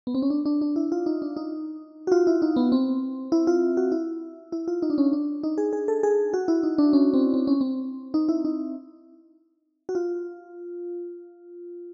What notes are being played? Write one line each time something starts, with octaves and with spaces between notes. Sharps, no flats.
B3
C4
C#4
D4
D4
D4
E4
F4
D#4
D4
D#4
F#4
F4
E4
D#4
B3
C4
E4
F4
F#4
E4
E4
F4
D#4
D4
C#4
D4
D#4
G#4
G#4
A4
G#4
F#4
E4
D#4
D4
C#4
C4
C4
C#4
C4
D#4
E4
D#4
F#4
F4